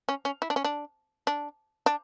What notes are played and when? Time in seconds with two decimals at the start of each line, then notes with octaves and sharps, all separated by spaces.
0.09 C#4
0.25 C#4
0.42 E4
0.50 D4
0.56 C#4
0.64 D4
1.27 D4
1.86 D4